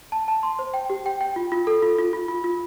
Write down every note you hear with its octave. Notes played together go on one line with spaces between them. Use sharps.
A5
A5
C6
C5
G5
G4
G5
G5
F4
F4
A4
F4
F4
F4
F4
F4